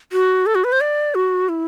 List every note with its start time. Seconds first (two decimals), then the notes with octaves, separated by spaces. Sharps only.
0.12 F#4
0.46 A4
0.55 F#4
0.64 B4
0.72 C5
0.81 D5
1.15 F#4
1.49 E4